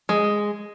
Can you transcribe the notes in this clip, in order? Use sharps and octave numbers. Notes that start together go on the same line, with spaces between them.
G#3